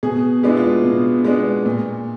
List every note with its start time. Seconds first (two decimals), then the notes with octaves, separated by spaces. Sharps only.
0.03 B2 G#4
0.43 G#3 B3 D4 E4
0.57 F4
0.84 B2
1.25 G#3 B3 D4
1.66 A#2